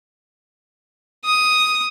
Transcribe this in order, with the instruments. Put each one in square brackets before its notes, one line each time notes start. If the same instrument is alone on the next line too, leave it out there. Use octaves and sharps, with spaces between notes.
[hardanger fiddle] D#6